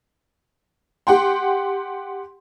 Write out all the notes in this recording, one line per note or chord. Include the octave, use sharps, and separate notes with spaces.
G4 F#5 G5 C6